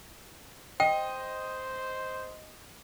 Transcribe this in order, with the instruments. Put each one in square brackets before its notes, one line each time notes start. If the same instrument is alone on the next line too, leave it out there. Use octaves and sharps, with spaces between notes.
[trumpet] C5 [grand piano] D#5 [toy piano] G5